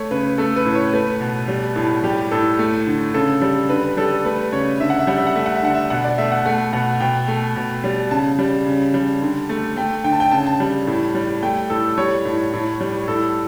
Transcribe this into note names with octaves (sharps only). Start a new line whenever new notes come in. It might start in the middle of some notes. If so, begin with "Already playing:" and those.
Already playing: A3 C#5
C#3 B4
A3 A4
B4
A2
C#5
A3 B4
B2
G3
A2
G3 G4
A2 A4
A3
D3
C#3 A4
G3 A4
D3 B4
G3 A4
A3 B4
C#3 C#5
D3 E5
F#5
E5
G3 F#5
E5
F#5
A3 E5
F#5
E5
D3 F#5
E5
B2 F#5
D5
A3 E5
F#5
A3 F#5
B2 F#5
B2 G5
A3
B2
G3
C#3 A5
G3
C#3
G3
D3
A3
A3 G5
D3 G5
A5
G5
C#3 A5
A5
G3
A2
G3
A3 G5
A2 A4
G3 C#5
A2
A2
G3
A2 A4